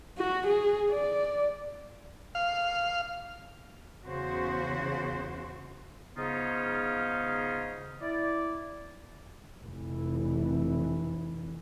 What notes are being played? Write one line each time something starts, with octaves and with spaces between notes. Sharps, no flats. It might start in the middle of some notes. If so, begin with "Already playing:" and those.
F#4
G#4
D5
F5
E2 C#3 F#4 C5
G#2 C#3 B3 C#4 D#4 F4
E4 D5
F1 E3